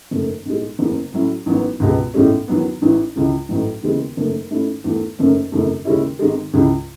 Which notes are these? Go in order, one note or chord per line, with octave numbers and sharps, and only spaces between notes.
F#1 F#2 D#3 A3
B1 A2 G#3
F#1 E2 C#3
A2 F#3 C#4 E4
A1 G#2 D#3 F#3 B3
C#2 B2 G#3 B3
B1 A2 E3 G#3 C#4
E2 D#3 F#3 B3
A1 G#2 E3
C#2 C#3 E3
A1 A2 F#3 A3 D#4
E1 D#2 C#3 E3 G#3
F#1 F#2 D#3 A3
G#2 D#3 A3 C#4 E4
E2 D#3 A3
F#1 F#2 D#3 A3 C#4
G#1 F#2 C#3 E3 A3
D#2 C#3 G#3 C#4 E4
G#1 G#2 D#3 G#3
C#2 C#3 E3